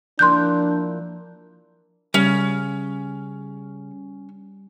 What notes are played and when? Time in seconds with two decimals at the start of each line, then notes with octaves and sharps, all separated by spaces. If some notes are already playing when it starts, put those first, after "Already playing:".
0.19 F3 A#3 D4 E4 C6 F#6 G6
2.14 C#3 G3 C#4